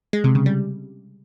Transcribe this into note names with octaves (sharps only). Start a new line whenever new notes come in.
G#3
C3
C#3
G3